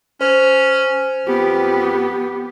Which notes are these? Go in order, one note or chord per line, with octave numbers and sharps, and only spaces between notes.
C#4 C5
F2 B3 G4